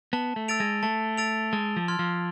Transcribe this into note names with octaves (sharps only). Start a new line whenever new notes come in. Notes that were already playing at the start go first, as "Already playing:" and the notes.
B3 A5
A3
E6 A6 D7 F7
G#3
A3 A5
E6 A6 D7 F7
G#3 A5
F3
C6 F6 G#6
F3